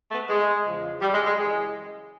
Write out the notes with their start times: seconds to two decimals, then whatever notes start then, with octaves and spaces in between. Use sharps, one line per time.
0.11 A3 B3
0.29 G#3
0.66 E2 C#3 F3
1.01 G3
1.14 G#3
1.26 G#3
1.38 F#2 C#3 E3 G#3